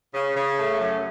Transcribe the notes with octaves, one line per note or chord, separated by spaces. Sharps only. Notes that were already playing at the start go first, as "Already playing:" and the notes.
C#3
C#3
A3
F#2